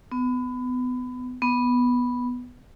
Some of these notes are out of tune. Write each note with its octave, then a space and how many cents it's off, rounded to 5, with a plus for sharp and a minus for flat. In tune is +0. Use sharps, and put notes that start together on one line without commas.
B3 +25
B3 -5